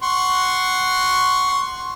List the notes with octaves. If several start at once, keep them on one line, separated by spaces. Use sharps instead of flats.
F#5 C6 C#6